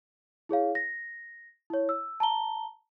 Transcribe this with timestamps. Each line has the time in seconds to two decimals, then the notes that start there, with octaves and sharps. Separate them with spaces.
0.49 E4 G#4 C#5 F5
0.75 A#6
1.70 E4 C#5
1.89 E6
2.20 A5 A#5 G7